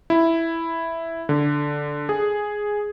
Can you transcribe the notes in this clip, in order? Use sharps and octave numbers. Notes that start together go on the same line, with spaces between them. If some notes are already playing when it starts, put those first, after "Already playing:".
E4
D3
G#4